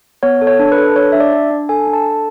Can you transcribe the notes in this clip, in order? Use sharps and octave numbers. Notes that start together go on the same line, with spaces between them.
B3 C#5
A4
C#5
D4
B4
A4
D4 C#5
D4 E5
D5
D4
D4
A4 G#5
D4
A5
A4